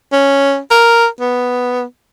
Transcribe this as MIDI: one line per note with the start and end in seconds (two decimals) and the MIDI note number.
0.12 0.58 61
0.71 1.07 70
1.20 1.83 59